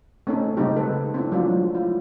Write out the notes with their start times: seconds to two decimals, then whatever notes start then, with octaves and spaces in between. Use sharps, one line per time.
0.27 A3 C4 C#4 D#4 A4
0.57 C#3 G3 G#3 C4 D#4 G4
0.77 A4 B4
1.14 C4 D4 E4
1.32 F3 F#3 G#3 A3 D4 F4
1.75 E4 F4